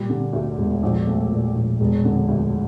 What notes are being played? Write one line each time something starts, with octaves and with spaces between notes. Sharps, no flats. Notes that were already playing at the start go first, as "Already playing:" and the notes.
Already playing: A#2 G3
D3
D2
E1
A#1
A3
A#2
A#1
E1
D3
D2